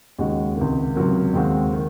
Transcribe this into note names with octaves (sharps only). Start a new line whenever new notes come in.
D#2 C#3 G#3 D#4 F#4
C#2 C3 D#3
C#2 C3 F#3 A#3
D#2 D#3 G#3 C4 F#4
D#3